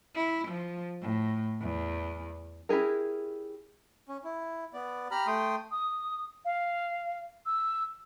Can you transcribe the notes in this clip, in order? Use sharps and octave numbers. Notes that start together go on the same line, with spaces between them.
E4
F3
A2
E2
C#4 E4 G4 G#4 A#4
C#4
E4
B3 D5
G4 A#5 B5 F6
A3 G5 C6 D#6
D#6
F5
E6